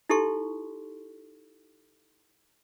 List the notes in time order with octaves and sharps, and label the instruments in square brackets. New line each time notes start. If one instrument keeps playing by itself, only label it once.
[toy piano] D#4 E4 G4 A4 C6 C#6